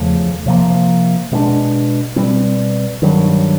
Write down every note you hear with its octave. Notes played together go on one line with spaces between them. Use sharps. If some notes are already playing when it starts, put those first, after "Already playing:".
Already playing: E2 C#3 F3 A3
C3 F3 A#3
B2 G#3 B3 D4
B2 G3 C4
G2 D#3 F#3